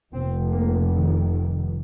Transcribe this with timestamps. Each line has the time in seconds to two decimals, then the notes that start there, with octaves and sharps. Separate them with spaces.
0.13 F1 F2 C3 C4
0.51 A#3
0.90 D#3